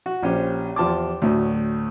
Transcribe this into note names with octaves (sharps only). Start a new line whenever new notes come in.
F#4
A#1 C#4 G4 C5
E2 F3 G4 A5 C6 D6
D2 A2 F#3